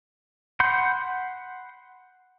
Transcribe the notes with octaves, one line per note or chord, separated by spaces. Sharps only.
F#5 B5 C6 G6